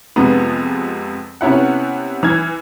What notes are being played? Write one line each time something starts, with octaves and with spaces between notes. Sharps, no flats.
F2 C3 G#3 B3
C3 B3 C#4 E4 F#5
E3 F6 G#6